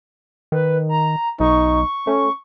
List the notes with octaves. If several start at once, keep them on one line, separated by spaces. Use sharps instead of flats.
D#3 B4
A#5
B1 D#4 C#6
A3 C#4